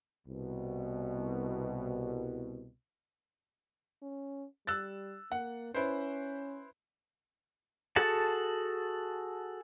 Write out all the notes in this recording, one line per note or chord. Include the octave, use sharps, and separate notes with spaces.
C2 B2
C#4
G3 E6 F#6 A6
A#3 F#5
C#4 E4 B4 C5
F#4 G#4 A4 F#5 A5